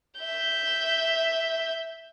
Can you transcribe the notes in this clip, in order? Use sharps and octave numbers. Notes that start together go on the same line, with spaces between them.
E5 G6